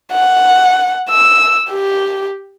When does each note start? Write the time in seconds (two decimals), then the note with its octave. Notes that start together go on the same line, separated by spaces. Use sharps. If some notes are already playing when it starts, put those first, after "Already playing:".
0.13 F#5
1.10 E6
1.70 G4